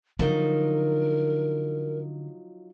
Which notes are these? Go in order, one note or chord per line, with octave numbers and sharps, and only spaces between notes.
D3 F3 F#3 D#4 A#4